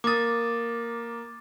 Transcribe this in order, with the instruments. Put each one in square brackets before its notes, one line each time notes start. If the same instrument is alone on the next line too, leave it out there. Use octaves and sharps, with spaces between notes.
[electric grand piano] A#3 D#6 [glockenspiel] D6 A6